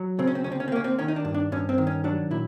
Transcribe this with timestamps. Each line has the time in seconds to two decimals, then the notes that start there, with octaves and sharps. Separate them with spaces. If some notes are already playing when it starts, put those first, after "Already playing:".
Already playing: F#3
0.19 C#3 C4
0.27 C#4
0.35 C4
0.44 D2 C#4
0.52 C4
0.60 C#4
0.68 C4
0.72 A#3 C#4
0.84 C4
0.99 D#3 C#4
1.08 D#4
1.16 D4
1.25 G2
1.34 D4
1.52 G2 C#4
1.69 C4
1.78 D#3
1.87 C#4
2.04 F#3 D4
2.31 A#2 E4